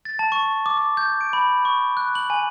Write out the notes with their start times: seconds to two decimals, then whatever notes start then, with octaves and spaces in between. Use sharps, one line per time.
0.05 A6
0.19 A5
0.32 C#6
0.66 D6
0.78 D6
0.97 G6
1.21 D7
1.33 B5
1.65 C#6
1.97 F#6
2.15 F#7
2.30 G#5